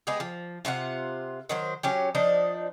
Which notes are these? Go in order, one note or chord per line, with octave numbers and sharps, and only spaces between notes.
G#3 B3 G4 G#4
F3
C3 F4 F#4 F#5
D#3 F#3 C5
F#3 C#4 G4
F3 D4 D#4 D#5